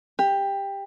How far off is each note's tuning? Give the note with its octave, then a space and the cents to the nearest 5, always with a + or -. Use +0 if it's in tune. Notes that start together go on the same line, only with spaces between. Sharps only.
G4 +15